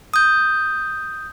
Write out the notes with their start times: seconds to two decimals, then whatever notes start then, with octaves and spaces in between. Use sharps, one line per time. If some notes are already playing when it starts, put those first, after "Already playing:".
0.14 D#6 G6